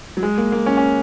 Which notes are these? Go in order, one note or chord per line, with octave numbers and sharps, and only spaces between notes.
F#3
G#3
A#3
A#3
C#4
C#4